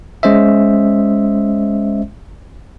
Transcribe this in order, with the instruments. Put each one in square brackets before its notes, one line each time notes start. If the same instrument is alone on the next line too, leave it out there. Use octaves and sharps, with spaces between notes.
[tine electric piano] G#3 C#4 C5 D#5 E5